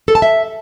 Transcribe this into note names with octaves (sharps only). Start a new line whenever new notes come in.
A4
A5
E5